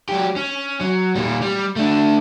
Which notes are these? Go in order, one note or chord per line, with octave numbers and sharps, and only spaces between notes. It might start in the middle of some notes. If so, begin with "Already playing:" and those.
F#3 G4
C#4
F#3
A#2 G3
G3
A3 D4